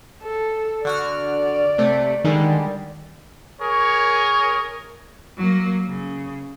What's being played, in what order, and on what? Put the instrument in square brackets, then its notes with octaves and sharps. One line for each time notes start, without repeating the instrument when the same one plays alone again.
[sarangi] A4
[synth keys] D3 F#4 F6 [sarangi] D5
[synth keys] C3 A3
[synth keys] D3 G3 G#3 [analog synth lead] D#3
[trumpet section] G#4 A#4 C#5 C#6
[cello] F#3 A#3
C#3